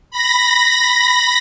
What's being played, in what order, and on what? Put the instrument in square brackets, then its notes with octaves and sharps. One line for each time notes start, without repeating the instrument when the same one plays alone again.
[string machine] B5 A#6